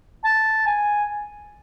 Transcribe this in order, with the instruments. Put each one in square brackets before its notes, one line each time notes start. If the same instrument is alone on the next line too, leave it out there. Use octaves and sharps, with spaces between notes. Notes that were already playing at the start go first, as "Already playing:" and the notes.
[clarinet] A5
G#5